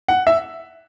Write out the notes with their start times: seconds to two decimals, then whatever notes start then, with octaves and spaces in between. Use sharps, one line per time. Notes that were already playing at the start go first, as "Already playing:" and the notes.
0.08 F#5
0.27 E5